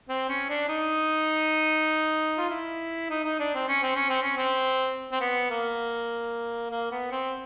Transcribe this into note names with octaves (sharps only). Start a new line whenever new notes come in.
C4
C#4
D4
D#4
F4
E4
D#4
D#4
D4
C4
C#4
C4
C#4
C4
C#4
C4
C4
B3
A#3
A#3
B3
C4